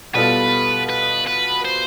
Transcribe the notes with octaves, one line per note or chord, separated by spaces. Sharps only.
B2 G3 B3 F4 A4 B4
B4
B4
C5